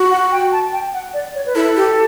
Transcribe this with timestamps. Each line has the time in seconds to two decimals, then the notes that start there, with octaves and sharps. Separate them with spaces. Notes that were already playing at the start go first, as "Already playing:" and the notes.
Already playing: F#4
0.11 F#5
0.32 G5
0.52 A5
0.73 G5
0.94 F#5
1.14 D5
1.35 C#5
1.46 B4
1.55 E4 A4
1.76 G4